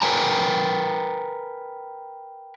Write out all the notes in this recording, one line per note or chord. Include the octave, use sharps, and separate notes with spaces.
A#4 B4 G5 G#5 A#5